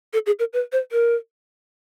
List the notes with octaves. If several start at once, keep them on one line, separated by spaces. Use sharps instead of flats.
A4
G#4
A#4
B4
C5
A#4